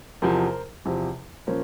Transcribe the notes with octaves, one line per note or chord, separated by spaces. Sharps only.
E2 C3 F3 A#4 C5
E2 C3 F3
A#2 F3 A#3 C#4 A#4 C5